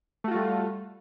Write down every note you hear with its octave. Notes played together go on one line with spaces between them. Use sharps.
G3 A3 F4 F#4